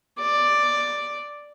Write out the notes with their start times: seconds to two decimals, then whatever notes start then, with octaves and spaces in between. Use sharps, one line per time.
0.19 D5